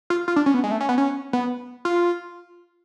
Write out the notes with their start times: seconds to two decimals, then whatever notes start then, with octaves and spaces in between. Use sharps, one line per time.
0.10 F4
0.28 F4
0.36 D4
0.46 C#4
0.54 B3
0.64 G#3
0.71 A3
0.81 C#4
0.89 B3
0.98 C#4
1.33 B3
1.85 F4